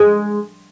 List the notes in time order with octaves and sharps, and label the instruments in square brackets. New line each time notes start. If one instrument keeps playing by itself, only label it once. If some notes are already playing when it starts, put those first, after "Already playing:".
Already playing: [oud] G#3